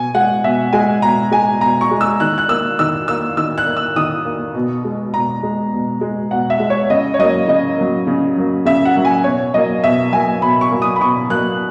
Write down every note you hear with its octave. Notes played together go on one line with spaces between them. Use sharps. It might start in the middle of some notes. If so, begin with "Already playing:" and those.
Already playing: B2 G#5
G#3 F#5
B2 E5
G#3 G#5
B2 A#5
G#3 G#5
B2 A#5
C#6
G#3
E6
D#3 F#6
F#6
A#3 E6
D#3 E6
A#3 E6
D#3 E6
F#6
A#3
E6
D#3 D#6
A#3
B2
G#3
B2 A#5
G#3
B2
G#3
B2 F#5
E5
G#3
C#5
C#3 D#5
C#5
F#3 A#3 D#5
C#3 D#5
F#3 A#3
C#3
F#3 A#3
C#3 E5
F#5
F#3 A#3
G#5
B2 C#5
F#3 A#3 D#5
B2 E5
F#3 A#3 G#5
B2 B5
C#6
F#3 A#3
D#6
B5
B2 C#6
F#3 A#3 F#6